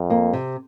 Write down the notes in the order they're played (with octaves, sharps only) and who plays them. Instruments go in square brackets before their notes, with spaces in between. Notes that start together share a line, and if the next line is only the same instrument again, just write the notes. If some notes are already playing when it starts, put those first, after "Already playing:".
Already playing: [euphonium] F2
[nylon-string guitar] A#3
C3